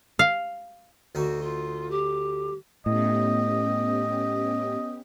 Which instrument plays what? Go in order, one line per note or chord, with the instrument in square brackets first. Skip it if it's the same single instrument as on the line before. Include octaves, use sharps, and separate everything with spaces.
[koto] F5
[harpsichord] D2 D#4 [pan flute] F#4
[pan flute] F4
G4
[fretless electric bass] A2 [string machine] B3 C#4 G4 [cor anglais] D#5